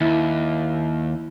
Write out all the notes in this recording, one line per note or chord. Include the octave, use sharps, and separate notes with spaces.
D#2 E4 A5